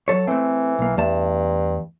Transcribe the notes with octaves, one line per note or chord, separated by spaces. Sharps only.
F#3 A4 C#5
E3 A3 C4
B1 A#3
E2 G2 A3 A5